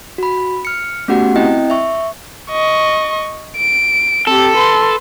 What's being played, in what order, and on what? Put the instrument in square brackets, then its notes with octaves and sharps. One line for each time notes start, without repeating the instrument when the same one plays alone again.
[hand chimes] F#4 B5
F6 C#7
A3 B3 C#4 F#4 G4 F#5
C4 E4 D#5 G5
E5 C#6
[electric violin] D#5 C#6
D7
[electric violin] C4 G4 [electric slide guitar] A4
[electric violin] B4 C6